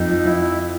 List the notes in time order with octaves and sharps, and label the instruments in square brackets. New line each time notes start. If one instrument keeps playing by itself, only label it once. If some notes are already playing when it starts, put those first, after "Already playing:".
Already playing: [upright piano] F2 [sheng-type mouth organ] D#4
[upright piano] F3
[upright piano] F3 [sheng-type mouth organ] E4